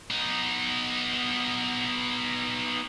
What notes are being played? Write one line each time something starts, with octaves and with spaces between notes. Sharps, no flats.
B3 D#4